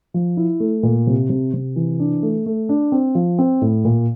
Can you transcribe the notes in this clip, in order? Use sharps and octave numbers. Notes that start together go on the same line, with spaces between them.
F3
E4
A3
A#2
C3
C3
C3
E3
D4
A3
A3
D4
C4
F3
C4
A2
A#2